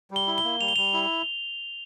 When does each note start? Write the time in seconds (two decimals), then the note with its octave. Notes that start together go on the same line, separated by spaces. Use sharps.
0.11 G3
0.16 G7
0.27 E4
0.38 G7
0.44 A#3
0.60 G3 F7
0.68 G7
0.76 G3 F7
0.93 E4